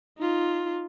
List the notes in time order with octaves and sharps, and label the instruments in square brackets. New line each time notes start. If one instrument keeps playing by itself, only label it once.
[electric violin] D#4 F4